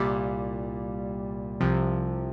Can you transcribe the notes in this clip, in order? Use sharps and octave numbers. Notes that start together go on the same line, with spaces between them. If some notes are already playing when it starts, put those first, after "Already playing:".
Already playing: C2 A#2 G3
C2 C3 F3